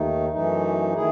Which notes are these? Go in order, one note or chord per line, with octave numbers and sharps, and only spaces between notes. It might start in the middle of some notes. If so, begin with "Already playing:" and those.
Already playing: D#2 D#3 A3 D#4
F#2 E3 A3 D#4
D#3 A3 E4 G#4